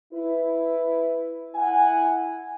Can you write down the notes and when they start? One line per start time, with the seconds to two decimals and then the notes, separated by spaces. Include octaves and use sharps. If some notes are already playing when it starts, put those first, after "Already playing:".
0.14 E4 B4
1.55 E4 F#5 G#5